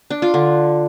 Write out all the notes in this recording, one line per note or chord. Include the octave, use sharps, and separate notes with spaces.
D4
F4
D3